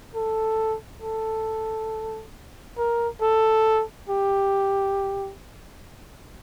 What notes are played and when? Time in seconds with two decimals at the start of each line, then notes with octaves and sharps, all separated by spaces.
0.15 A4
1.02 A4
2.78 A#4
3.22 A4
4.09 G4